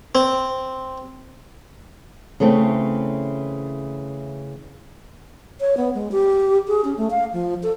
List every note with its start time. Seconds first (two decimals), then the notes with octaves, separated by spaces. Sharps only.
0.15 C4
2.40 C#3 E3 A3 C4
5.60 C#5
5.77 B3
5.94 G#3
6.12 G4
6.68 G#4
6.84 C#4
6.98 A3
7.11 F5
7.33 F3
7.63 A4